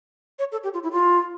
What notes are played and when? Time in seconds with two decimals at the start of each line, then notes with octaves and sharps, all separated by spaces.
0.39 C#5
0.52 A4
0.64 G4
0.74 F4
0.83 E4
0.92 F4